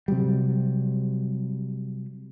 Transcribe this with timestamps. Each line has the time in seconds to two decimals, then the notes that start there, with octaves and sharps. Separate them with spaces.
0.08 C3 F#3 G3